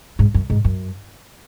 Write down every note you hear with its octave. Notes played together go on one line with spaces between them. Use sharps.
G#2
F#2
G#2
F#2